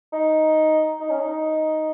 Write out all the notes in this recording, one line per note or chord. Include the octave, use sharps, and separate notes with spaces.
D#4
D#4
C#4
D#4
D#4